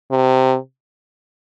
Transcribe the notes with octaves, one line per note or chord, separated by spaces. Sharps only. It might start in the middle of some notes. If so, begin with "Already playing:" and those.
C3